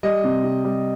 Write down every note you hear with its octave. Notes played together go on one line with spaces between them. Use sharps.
G3 D#5
C3
C3
G3